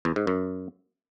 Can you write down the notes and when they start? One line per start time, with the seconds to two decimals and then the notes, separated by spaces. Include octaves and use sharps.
0.05 E2
0.16 G#2
0.27 F#2